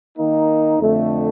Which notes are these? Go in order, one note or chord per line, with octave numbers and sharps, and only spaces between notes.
D#3 A#3 D#4
F2 D3 A3